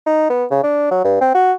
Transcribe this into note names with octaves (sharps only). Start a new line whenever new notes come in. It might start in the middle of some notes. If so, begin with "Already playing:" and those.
D#4
B3
C#3
D4
F#3
G2
C4
F#4